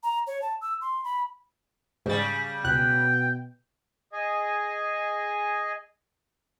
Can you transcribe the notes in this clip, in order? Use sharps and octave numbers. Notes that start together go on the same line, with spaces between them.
A#5
C#5
A5
E6
C6
B5
G#2 C#3 G3 A6
C#2 B2 G5 F#6
G#4 D#5 G#5